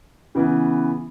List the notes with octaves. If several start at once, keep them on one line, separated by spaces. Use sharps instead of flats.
C#3 E3 B3